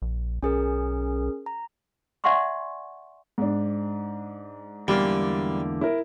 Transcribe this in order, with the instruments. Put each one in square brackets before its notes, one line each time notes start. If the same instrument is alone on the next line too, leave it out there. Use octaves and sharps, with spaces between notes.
[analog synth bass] A#1
[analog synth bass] B1 [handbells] C#4 G#4 A#4
[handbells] A#5
[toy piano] D5 E5 F#5 G#5 C6 C#6
[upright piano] G#2 D4
[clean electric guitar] E2 D3 A#3 [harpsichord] G3
[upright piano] E4 A#4